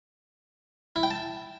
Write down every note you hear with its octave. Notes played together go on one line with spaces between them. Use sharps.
E4
G5
A5